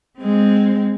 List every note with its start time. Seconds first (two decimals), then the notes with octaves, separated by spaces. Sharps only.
0.19 G#3 C4